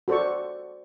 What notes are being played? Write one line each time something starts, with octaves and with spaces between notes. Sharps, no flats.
F#4 A4 C5 D5 C#6